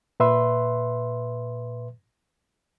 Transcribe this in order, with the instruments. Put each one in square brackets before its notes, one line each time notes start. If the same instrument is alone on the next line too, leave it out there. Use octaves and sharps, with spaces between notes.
[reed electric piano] A#2 B4 E5 C6